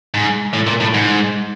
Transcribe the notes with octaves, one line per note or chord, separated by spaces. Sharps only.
G#2
A2
A#2
A2
G#2